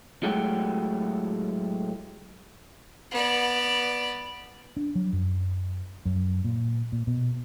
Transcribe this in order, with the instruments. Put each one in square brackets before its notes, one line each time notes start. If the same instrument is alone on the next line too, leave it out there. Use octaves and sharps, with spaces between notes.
[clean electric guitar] A2 F#3 G#3 A3 F#4 G4
[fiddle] B3 D5
[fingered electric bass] D4
F#3
F#2
F#2
A#2
A#2
B2